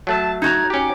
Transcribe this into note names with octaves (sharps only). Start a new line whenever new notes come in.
F#3 A3 A5
D#4 F#4 A#5 G#6
C#4 G4 D6